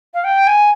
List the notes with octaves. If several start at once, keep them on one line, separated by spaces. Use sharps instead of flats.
F5
G5
G#5